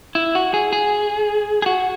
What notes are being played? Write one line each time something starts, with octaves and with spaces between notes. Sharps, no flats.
E4
F#4
G#4
G#4
G#4
F#4